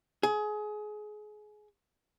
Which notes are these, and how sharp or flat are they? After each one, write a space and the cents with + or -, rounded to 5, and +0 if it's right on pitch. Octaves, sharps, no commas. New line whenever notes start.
G#4 +25